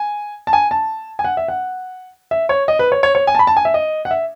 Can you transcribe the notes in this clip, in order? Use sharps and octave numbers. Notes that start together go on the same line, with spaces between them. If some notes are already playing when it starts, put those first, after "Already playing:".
Already playing: G#5
A5
G#5
A5
G#5
F#5
E5
F#5
E5
C#5
D#5
B4
C#5
C#5
C#5
G#5
A5
B5
A5
G#5
E5
D#5
F#5
E5